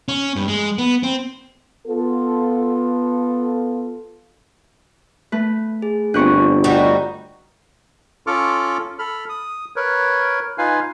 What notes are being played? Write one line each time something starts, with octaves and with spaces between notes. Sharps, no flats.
C#4
G2
G#3
B3
C4
B3 F4 A4
A3 B4
G#4
G1 C4 D4 F4 C#6 F#6
G3 D#4 F#4
C#4 F4 A4 C#6 D6 F6
A4 B5 F6
D#6
A#4 B4 C#5
D#4 F4 B4 F5 G#5